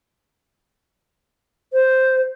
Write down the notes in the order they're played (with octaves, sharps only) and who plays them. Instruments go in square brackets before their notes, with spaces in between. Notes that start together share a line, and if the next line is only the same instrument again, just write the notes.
[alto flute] C5